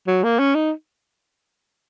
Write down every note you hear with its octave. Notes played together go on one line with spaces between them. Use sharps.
F#3
A#3
C#4
D#4